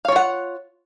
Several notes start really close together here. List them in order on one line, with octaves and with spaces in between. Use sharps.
F5 C#5 F4 F#5